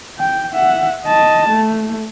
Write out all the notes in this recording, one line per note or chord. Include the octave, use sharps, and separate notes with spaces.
G5
E5 F#5
D#5 A5
A3